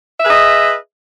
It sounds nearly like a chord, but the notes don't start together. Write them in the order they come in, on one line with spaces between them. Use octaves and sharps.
E5 B4 G#4 D#5